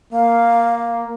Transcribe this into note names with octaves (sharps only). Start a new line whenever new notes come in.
A#3 F5